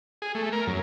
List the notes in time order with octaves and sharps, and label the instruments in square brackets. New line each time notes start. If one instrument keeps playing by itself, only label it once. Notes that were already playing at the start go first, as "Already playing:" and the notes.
[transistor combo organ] G#4
A3
A#4
F#2